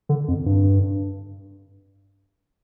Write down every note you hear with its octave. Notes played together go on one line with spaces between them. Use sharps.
D3
F2
G2